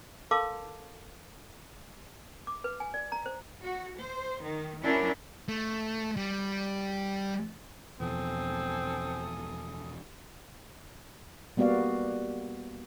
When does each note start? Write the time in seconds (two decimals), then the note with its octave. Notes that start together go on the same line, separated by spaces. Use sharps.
0.31 A4 A#4 F5 A5 C6 D6
2.47 D6
2.64 B4
2.80 G#5
2.94 D5
3.12 A#5
3.26 C5
3.64 F#4
3.99 C5
4.43 D#3
4.85 F#3 C#4 D4 E4 A#4
5.48 A3
6.17 G3
8.00 E2 B2 F3 C4 A4 G#5 D#6
11.57 G3 A#3 B3 F#4 D5 F5